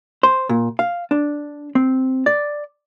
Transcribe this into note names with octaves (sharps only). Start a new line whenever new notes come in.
C5
A#2
F5
D4
C4
D5